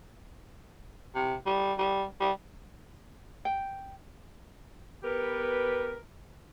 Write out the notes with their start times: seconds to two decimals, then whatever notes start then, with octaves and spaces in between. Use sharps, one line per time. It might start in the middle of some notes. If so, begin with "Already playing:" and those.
1.15 C3
1.46 G3
1.78 G3
2.20 G3
3.45 G5
5.03 B3 G4 A#4 B4